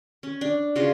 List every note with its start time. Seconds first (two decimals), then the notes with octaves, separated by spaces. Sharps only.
0.23 C#4
0.41 D4
0.76 C#3 F4 F#4 C6